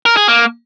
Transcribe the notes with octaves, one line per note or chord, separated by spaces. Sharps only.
A#4
G#4
A#3